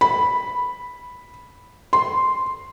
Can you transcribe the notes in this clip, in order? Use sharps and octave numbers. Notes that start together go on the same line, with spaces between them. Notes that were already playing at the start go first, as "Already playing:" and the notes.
B5
C6